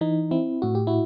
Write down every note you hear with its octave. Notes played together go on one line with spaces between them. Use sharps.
E3 D#4
C4 E4
A2 F#4
G4
E4 F#4